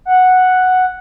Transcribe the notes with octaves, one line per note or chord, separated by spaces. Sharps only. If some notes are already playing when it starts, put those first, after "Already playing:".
F#5